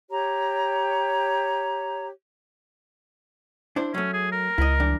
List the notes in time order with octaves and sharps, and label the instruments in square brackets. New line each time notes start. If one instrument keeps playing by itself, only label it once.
[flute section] G4 C#5 A#5
[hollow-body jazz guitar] D4 E4 C5
[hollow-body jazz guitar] F#3 A3 [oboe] C#4
[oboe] G#4
A#4
[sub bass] C#2 [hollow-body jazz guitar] E4 D#5
[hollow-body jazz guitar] E3 G3 D4